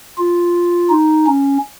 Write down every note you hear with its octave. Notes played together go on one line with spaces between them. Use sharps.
F4
D#4
C#4